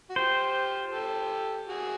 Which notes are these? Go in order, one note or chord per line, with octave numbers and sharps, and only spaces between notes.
F#4
F4 G4 C5
G4 A4
F#4 G#4